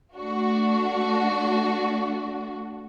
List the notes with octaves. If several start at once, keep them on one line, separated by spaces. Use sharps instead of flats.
A3 D4 F#4